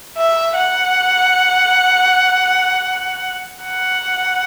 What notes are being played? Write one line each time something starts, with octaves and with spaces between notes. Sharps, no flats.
E5
F#5
F#5